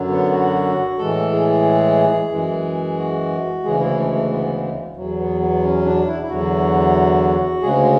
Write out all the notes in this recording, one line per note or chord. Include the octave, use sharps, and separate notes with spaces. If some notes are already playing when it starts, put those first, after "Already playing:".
Already playing: F#2 D3 F#3
B3
F#4
A2 E3 G#3 A4
G#4
F#2 E3 G#3
F#4
D2 C#3 E3 G#3 G#4
E4
A3
A3
B3
E2 B2 F#3
B3
B3
C#4
D4
E4
E4
E2 D3 F#3 F#4
D2 C#3 G#3 G#4